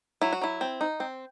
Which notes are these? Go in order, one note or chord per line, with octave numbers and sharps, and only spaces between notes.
F#3 E4
F#4
F#3 E4
C4
D#4
C4